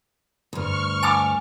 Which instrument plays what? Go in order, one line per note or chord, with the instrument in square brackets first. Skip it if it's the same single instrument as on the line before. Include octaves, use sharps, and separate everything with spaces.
[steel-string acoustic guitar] D2 G2 [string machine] C#6 F6
[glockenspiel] G#5 F7 [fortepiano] A5 D6